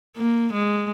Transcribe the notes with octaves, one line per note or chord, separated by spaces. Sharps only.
A#3
G#3